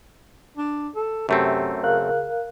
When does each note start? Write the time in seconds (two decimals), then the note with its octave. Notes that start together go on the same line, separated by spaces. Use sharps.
0.57 D4
0.96 A4
1.29 F#2 C3 A3 C4
1.83 C#3 A#4 F5 F#6